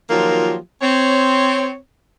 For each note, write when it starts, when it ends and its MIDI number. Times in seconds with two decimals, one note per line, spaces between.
0.10 0.56 51
0.10 0.56 53
0.10 0.56 54
0.10 0.56 58
0.10 0.56 65
0.10 0.56 67
0.82 1.75 60
0.82 1.75 73